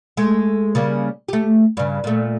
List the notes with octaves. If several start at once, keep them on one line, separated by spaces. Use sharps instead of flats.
G#3 A3
C#3 G3 A#3
A3 G4
G2 C#3
A#2 A3